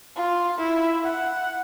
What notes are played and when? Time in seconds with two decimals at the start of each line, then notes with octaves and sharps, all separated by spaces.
0.16 F4
0.58 E4
1.03 F#5